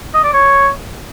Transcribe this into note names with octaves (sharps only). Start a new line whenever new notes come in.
D#5
D5
C#5